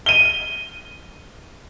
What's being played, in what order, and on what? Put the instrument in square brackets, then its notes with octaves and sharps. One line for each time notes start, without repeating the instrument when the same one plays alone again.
[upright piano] D#7 G7